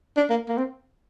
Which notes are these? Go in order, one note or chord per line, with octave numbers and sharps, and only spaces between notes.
D4
A#3
A#3
C4